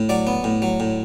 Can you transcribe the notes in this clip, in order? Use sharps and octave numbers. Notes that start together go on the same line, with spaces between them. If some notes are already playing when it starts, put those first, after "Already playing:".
Already playing: A2
F#3 D5
B3
A2
F#3
A2